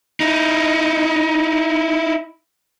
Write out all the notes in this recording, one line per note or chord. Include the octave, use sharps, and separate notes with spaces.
D#4 E4